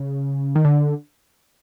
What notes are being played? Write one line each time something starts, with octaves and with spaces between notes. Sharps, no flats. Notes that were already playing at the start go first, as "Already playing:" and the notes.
Already playing: C#3
D#3
D3